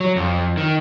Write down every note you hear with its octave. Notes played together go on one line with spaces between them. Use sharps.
F#3
F2
D#3